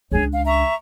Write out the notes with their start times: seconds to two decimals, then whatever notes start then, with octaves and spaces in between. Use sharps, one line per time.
0.12 C#2 D4 G#4 C#5
0.32 F5
0.46 E5 A#5 C#6